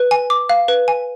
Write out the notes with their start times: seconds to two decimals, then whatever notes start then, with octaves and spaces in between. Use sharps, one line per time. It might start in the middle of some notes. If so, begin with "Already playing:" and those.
Already playing: B4
0.11 G#5
0.30 D6
0.49 F5
0.68 B4
0.88 G#5